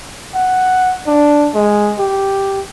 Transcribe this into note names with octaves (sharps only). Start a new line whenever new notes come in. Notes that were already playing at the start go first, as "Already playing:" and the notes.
F#5
D4
G#3
G4